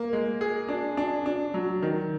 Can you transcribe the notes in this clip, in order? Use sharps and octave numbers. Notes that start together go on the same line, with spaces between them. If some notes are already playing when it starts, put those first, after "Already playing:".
Already playing: A#3
G#3
G#4
D4
D4
D4
F#3
D#3